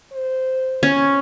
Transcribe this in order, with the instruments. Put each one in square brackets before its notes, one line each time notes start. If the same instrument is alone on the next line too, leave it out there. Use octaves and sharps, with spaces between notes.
[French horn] C5
[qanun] C#4